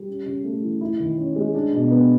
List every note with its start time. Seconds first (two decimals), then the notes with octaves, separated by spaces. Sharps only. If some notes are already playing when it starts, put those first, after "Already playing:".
Already playing: G3
0.08 C#4
0.26 C#3
0.44 A3
0.63 E3
0.81 E4
1.00 D#3
1.18 C#4
1.36 G#3
1.55 D4
1.73 B2
1.91 B3